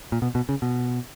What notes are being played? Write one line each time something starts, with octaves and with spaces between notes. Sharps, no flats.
A#2
B2
B2
C#3
B2